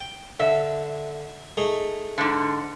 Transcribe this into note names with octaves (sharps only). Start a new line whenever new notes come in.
G5
D3 E5
A3 D#4 G#4
G#2 D3